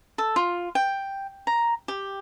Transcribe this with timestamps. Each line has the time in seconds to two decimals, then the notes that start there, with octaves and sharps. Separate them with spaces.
0.18 A4
0.36 F4
0.75 G5
1.47 A#5
1.88 G4